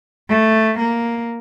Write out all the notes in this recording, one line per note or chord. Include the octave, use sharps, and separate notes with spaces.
A3
A#3